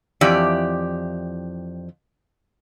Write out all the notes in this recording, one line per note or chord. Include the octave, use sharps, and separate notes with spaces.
F2 E3 G4 D5